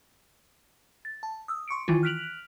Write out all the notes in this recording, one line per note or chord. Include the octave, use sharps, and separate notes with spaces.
A6
A5
D#6 E6
C6 C#6 C#7 D7
D#3 E3 E4 F4
F6 F#6 B6 D7 F7 F#7